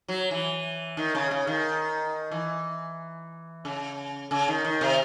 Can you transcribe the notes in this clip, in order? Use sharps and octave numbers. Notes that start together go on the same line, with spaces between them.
F#3
E3
D#3
C#3
C#3
D#3
E3
C#3
C#3
D#3
D#3
C3